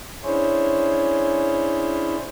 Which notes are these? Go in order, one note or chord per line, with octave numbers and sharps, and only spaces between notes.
C#4 D4 E4 G#4 C5 C#5